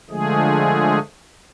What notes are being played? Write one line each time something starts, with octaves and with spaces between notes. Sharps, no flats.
D3 F3 G#3 A3 G#4